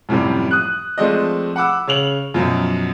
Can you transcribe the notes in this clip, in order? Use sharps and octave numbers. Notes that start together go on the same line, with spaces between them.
F#2 A2 C3 F3 G3
D#6 F#6
F3 G#3 A3 C4 D5 D#5
F#5 B5 D6 E6
C#3 C#5 F7 F#7
F#2 B2 F3 F#3